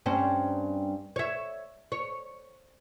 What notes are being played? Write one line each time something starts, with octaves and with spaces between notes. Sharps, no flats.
G2 C4 C#4
C#5 E5
C#5